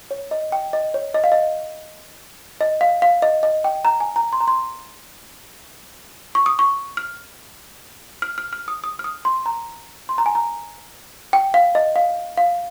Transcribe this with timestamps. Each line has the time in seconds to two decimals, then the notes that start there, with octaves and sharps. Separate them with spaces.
0.11 C#5
0.31 D#5
0.52 G5
0.73 D#5
0.94 C#5
1.14 D#5
1.24 F5
1.32 D#5
2.61 D#5
2.81 F5
3.02 F5
3.22 D#5
3.43 D#5
3.64 G5
3.85 A#5
4.00 G#5
4.16 A#5
4.33 C6
4.41 A#5
4.48 C6
6.35 C#6
6.46 D#6
6.59 C#6
6.97 F6
8.22 F6
8.38 F6
8.53 F6
8.68 D#6
8.84 D#6
8.99 F6
9.04 D#6
9.25 C6
9.46 A#5
10.09 C6
10.18 A#5
10.26 G#5
10.35 A#5
11.33 G5
11.54 F5
11.75 D#5
11.96 F5
12.37 F5